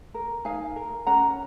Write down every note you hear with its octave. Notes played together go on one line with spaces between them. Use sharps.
A#4
D#4 F5 G#5
A#4
C#4 F#5 A#5